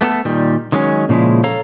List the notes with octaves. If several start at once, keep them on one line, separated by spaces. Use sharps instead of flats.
A3 B3 F#4 A4
A#2 D#3 G3
D#3 F#3 G#3 B3 C#4
A#2 C#3 F3 G#3 E4
A4 C#5 F5 A#5